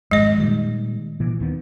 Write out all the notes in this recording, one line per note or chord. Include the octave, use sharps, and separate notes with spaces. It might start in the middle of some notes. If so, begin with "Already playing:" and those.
G#1 F2 G#3 D#5
A#2 D#3 G3
A#2 E3
D#2 D#3 B3